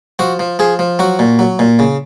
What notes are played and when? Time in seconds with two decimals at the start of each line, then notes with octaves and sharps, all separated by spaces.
0.19 F3 F#4
0.39 F3
0.59 F3 G#4
0.79 F3
0.99 F#3 F#4
1.19 A#2
1.39 F#3
1.59 A#2
1.79 C#3